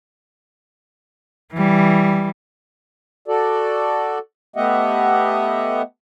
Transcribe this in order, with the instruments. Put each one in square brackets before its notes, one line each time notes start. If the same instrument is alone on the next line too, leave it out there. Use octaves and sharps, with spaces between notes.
[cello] E3 G3
[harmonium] F#4 A4 D5
A3 B3 G4 D#5 E5 F#5